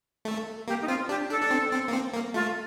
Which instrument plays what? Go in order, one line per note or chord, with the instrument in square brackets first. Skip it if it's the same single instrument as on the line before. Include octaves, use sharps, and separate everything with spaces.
[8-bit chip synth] A3
[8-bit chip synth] A#3 [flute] G4
[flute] D#4
[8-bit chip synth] C4 [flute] F4
[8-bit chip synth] D4 [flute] G4
[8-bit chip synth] D4 [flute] A4
[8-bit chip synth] D4
C4
C4
A#3
C4
A#3
[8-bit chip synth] A3 [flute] F4